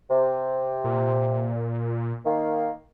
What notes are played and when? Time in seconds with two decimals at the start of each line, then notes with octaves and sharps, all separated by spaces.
0.10 C3
0.84 A#2
2.25 D#3 A#3